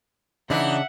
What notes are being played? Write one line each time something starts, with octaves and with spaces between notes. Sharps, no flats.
C#3 E3 D4 D#4 E5 F#5